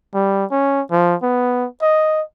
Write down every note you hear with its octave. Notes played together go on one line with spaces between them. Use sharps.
G3
C#4
F3
B3
D#5